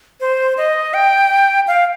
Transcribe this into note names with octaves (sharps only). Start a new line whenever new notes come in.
C5
D#5
G5
F5